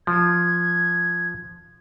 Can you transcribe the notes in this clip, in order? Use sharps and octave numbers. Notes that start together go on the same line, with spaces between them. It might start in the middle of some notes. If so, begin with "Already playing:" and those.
F3 G#6